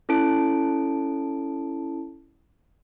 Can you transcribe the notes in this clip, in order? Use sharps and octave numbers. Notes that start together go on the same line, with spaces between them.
C#4 E4 A4 A5 D7